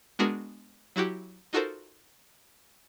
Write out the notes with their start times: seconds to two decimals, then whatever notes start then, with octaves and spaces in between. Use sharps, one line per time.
0.19 G#3 B3 D4 F#4 G#4 A#4
0.96 F#3 E4 F#4 G4
1.53 D#4 F4 F#4 A4 A#4 C5